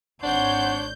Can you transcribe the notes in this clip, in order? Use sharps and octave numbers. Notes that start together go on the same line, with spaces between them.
G#1 D4 C5 C#5 F#5 G6